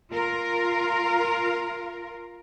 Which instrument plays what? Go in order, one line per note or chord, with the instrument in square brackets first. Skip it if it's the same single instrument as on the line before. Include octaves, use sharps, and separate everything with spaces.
[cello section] F4 A#4